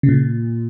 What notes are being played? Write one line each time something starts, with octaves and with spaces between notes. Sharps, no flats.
C#3
A#2